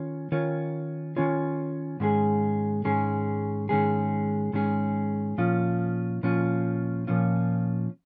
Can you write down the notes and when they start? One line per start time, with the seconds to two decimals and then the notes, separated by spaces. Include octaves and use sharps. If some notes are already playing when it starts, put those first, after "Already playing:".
Already playing: D#3 C#4 F4 C#5
0.32 D#3 C#4 F4 C#5
1.16 D#3 C#4 F4 C#5
2.00 G#2 D#3 G#3 C#4 G#4
2.85 G#2 D#3 G#3 C#4 G#4
3.69 G#2 D#3 G#3 C#4 G#4
4.53 G#2 D#3 G#3 C#4 G#4
5.38 A#2 F3 C#4 F4
6.23 A#2 F3 C#4 F4
7.07 A#2 F3 C#4 F4